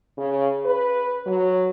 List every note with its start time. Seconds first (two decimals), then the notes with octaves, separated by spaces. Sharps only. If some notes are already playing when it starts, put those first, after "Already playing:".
0.18 C#3
0.65 B4
1.26 F#3